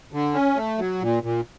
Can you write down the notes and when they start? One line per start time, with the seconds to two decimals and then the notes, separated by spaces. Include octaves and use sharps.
0.13 D3
0.34 C#4
0.56 A3
0.78 F#3
1.01 A#2
1.23 A#2